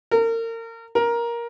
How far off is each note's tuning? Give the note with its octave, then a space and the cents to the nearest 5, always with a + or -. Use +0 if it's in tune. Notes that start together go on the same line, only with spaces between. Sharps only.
A#4 -35
A#4 +10